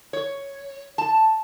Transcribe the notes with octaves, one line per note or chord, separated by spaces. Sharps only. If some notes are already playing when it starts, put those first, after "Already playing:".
C#5
A5